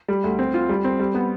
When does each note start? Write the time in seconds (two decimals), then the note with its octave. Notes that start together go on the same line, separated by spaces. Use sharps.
0.08 G3
0.24 D2
0.39 C4
0.54 F4
0.69 G3
0.84 C4
0.99 G3
1.14 B3